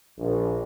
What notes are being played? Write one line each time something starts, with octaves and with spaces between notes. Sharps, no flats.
A#1